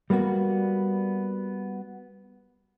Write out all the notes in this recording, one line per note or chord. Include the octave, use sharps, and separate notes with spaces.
G3 A#3 B3 F#4